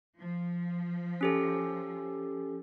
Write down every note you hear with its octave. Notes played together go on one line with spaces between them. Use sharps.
F3
C#4 G4 A4